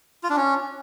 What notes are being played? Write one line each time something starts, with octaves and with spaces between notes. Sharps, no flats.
F4
D4
C#4